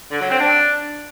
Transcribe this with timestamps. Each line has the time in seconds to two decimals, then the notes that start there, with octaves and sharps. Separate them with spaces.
0.11 D3
0.21 F#3
0.30 C4
0.40 D4